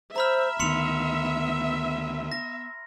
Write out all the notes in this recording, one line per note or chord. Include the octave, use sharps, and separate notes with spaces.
C5 E5 A#5 B5 F6
D2 D#3 B3 C6 C#7 F7
A#6